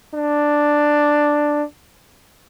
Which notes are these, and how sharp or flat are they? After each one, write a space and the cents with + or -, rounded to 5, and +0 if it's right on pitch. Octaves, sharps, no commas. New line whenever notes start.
D4 +5